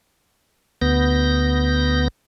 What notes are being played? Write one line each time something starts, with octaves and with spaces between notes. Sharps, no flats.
D2 B3 G6 A#6